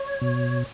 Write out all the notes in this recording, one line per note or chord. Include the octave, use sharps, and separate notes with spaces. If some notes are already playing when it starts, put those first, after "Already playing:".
Already playing: C#5
B2